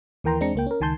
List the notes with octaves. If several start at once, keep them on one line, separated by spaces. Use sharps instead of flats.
D#2 E3 A#4 G5 A#5 C6
E2 G#3 C4 D4 A#5 C#7
C#2 A#3 G5
C#4 A#4
C#2 D#3 G#5 A5 C6 G6